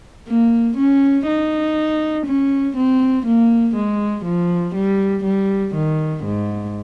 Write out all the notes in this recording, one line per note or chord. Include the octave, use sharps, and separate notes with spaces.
A#3
C#4
D#4
C#4
C4
A#3
G#3
F3
G3
G3
D#3
G#2